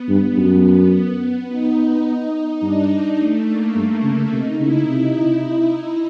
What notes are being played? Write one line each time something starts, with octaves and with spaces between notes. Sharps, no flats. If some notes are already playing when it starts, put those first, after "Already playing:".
Already playing: B3
G2
F#2
B3
D#4
D#4
G2 D4
D4
A3
A#3
G2
C#3
C3 D#4
C#3 E4
C3